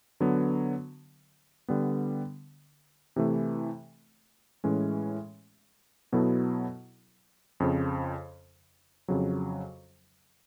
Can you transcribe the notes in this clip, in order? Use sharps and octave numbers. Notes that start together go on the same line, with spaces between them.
D3 F#3 B3
D3 G3 B3
C3 E3 A3
A2 E3 G#3 C#4
B2 F#3 B3 E4 A4
F2 C#3 F3
F2 C#3 F#3